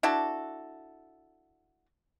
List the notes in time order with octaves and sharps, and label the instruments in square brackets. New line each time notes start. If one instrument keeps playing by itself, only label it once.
[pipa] D4 E4 F#4 A4